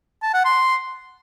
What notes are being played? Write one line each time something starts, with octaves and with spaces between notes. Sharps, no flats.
A5
F#5
C6